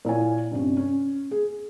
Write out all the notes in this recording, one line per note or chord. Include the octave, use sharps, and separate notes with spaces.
A#2 E4 C#5 G#5
G2 C3 C#4
C#4
G#4